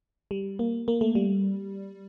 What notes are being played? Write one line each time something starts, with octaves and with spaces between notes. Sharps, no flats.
G3
A#3
A#3
A3
G3